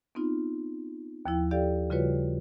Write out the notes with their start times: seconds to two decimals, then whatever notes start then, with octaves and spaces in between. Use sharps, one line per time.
0.15 B3 C4 D#4 F4
1.26 D#2 F3 E4 G5
1.51 G4 A4 D5 F5 G5
1.90 C#3 G3 F4 F#4 B4 C#5